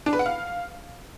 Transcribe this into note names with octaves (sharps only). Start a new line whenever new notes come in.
D4
B4
F#5
F5